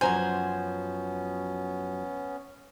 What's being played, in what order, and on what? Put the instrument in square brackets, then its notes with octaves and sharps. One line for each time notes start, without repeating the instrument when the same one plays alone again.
[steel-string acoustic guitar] F#2 F3 F#3 [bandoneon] B3 C#4 [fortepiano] C5 A#5 [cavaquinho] G#5